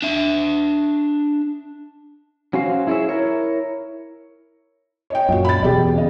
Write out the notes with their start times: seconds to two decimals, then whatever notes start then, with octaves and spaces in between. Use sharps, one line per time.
0.02 D4 E5
2.53 F#3 C#4 F#4 C5 F5
2.87 E4 G#4 A4 C#5 E5
3.09 E4 A#4 C#5
5.10 C#5 D#5 G5
5.29 F#2 A#2 F#4
5.45 B5 A6
5.62 E2 B2 G4 G#4 D5
5.95 C#3 D#5